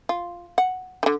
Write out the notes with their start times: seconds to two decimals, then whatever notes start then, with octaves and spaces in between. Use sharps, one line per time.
0.09 F4
0.58 F#5
1.03 D3 D#3